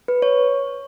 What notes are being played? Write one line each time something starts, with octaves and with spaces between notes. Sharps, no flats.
B4
C#5